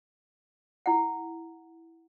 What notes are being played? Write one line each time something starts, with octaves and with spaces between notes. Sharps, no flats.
E4 F#5